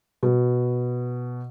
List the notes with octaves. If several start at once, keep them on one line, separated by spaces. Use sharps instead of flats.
B2